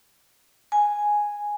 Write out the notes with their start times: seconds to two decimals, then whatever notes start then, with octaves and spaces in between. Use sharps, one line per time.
0.72 G#5